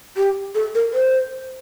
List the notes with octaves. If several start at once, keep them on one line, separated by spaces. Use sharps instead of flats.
G4
A4
A#4
C5